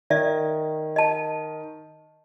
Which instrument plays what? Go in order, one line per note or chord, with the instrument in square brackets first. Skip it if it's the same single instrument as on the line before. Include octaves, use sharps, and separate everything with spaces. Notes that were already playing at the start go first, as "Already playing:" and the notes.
[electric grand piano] D#3 [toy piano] D5 E5
[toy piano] D#5 A5